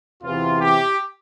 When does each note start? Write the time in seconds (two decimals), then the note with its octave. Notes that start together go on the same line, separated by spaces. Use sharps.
0.23 E2 C3 E3 F4
0.61 G4